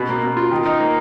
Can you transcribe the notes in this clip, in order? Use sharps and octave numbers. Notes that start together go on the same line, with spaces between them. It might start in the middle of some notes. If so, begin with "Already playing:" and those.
Already playing: B2
A#3
B2
F4
D#3
D#4
A#3